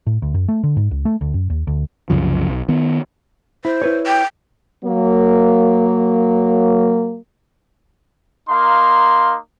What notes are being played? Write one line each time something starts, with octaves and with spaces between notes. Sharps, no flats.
A2
D2
F#2
A3
D3
G#2
C#2
A3
D2
F#2
D#2
D2
C2 F#2 C#3 F3
B1
D#3 B3
E4 C5
E4 B4 C#5
G5
F#3 A#3
A#3 D#4 F5 C6